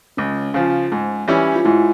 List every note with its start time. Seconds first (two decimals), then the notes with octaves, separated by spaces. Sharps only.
0.17 C#2 C#4
0.54 C#3 F3
0.92 G#2
1.28 E3 G3 C#4 E4
1.56 F4
1.65 G#2 E4